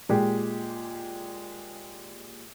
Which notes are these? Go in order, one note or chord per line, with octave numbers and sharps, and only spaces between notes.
A#2 G#3 G4